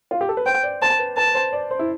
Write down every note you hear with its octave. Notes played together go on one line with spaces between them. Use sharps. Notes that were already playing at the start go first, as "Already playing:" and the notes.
F4
G4
A4
B4
C5 G5
D5
C5 A5
B4
B4 A5
C5
D5
C5
E4